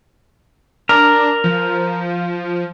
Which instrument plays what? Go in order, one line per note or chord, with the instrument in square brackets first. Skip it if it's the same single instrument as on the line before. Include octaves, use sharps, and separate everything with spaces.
[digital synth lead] D4 [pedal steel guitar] A#4
[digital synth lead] F3